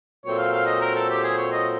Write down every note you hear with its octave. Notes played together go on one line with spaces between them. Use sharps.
A#2 F#3 A3 C4 C#5
F5
F5
D#5
A#4
A4
G4
G#4
C#5
D#5